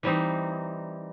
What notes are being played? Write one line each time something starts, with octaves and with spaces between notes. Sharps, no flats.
E3 G3 C4 D#4